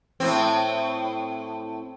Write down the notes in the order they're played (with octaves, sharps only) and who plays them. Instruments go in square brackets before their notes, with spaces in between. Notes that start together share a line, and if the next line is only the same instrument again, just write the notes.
[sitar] A2 C4